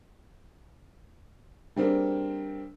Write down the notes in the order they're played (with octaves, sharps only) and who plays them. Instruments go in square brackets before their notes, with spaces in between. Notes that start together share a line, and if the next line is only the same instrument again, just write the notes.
[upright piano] G3 A#3 C4 D4 G#4